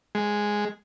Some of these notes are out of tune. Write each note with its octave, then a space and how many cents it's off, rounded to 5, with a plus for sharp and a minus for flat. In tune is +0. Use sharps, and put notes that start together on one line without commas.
G#3 -5